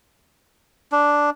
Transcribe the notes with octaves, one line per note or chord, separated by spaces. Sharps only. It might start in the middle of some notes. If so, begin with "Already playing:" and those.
D4